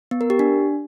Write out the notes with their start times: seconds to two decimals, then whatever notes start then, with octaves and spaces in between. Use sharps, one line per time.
0.11 B3
0.21 A#4
0.30 G4
0.39 D4